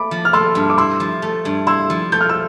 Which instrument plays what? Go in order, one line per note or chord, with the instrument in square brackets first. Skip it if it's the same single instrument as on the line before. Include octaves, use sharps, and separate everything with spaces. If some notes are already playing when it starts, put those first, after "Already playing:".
Already playing: [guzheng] A3 [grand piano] B5 D6
[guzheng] F3
[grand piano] F6
[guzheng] A3 [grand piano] C6 E6
[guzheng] G2
[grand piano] D6
[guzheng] E4 [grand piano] C6 E6
[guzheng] F3
A3
G2
[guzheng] E4 [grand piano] C6 E6
[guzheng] F3
[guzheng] A3 [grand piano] G6
[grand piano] F6
E6